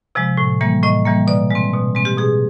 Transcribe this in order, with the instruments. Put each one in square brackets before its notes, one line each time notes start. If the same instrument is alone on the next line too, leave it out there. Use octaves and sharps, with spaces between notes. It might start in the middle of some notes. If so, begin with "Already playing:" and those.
[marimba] C3 F3 G#3
A2
E3 G3 A#3
A2 D#5
E3 G3 A#3
B2 D5
G#3 C4
B2
G#3 C4
G4
B2 G#4